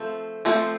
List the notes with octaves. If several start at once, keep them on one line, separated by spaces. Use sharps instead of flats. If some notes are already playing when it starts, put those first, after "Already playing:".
Already playing: F3 A3 C4
F3 A3 C4